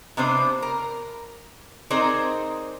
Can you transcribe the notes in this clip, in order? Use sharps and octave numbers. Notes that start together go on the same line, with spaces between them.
C3 B3 D4 C5 D5
A#4
C4 D#4 G#4 A#4 C5 D5